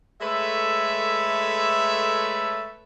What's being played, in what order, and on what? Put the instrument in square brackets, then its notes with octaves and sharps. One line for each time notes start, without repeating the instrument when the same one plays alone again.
[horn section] G#3 A3 A4 B4 C#5 E5